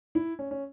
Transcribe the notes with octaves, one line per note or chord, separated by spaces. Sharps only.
E4
C#4
C#4